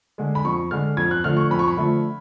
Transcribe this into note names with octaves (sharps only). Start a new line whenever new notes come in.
D3 G#3
B5
F2 C#6
D3 G#3 F6
F2 G#6
F#6
D3 F3 A3 F6
C#6
F2 B5
C#6
B5
D3 F3 A3